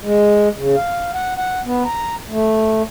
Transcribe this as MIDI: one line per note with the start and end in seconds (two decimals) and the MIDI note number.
0.02 0.49 56
0.57 0.75 49
0.76 1.11 77
1.14 1.34 78
1.37 1.61 78
1.65 1.83 59
1.85 2.15 82
2.30 2.82 57